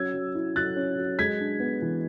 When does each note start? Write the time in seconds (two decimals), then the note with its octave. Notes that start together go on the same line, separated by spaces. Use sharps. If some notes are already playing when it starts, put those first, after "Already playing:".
Already playing: F#3 C#4 E6 G#6
0.14 F#3
0.35 E4
0.56 F#3 F#6 A6
0.76 C#4
0.98 F#3
1.19 G#3 G#6 B6
1.40 D4
1.60 B3
1.82 E3